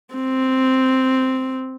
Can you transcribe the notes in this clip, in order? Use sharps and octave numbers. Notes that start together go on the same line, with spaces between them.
C4